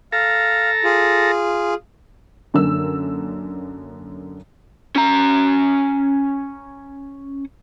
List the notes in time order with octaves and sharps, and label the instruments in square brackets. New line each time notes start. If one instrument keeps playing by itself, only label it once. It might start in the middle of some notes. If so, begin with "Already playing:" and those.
[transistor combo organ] A4 A#5 [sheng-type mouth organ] F5
[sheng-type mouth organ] F4 G#4
[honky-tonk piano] F#2 D3 A#3 E6
[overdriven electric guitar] C#4 A#5